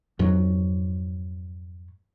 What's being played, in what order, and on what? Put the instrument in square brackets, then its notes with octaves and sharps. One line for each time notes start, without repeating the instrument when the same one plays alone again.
[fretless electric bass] F2 G#2 F#3